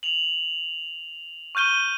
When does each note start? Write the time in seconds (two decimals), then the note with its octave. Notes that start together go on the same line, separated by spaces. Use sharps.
0.03 F7 F#7
1.55 C#6 F6 G6 D#7 G7